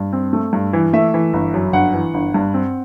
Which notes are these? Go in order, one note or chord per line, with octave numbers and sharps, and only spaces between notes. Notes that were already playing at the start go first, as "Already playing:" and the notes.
Already playing: G2
C4
A3
G2
E3
A3 E5
E3
G1
F#2
G1 F#5
E3
G1
G2
C4